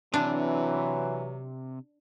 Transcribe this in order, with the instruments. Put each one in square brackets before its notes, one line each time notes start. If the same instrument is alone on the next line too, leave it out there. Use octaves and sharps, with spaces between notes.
[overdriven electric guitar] C3 [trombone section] E3 [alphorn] F#3 [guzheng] D4